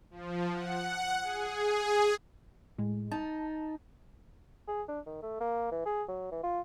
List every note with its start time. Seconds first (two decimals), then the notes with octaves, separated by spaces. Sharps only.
0.11 F3
0.52 F#5
1.21 G#4
2.78 A2 G#3
3.11 D#4 A5
4.68 G#4
4.88 D4
5.06 D#3
5.22 A3
5.40 A#3
5.72 E3
5.86 G#4
6.08 F#3
6.32 E3
6.43 F4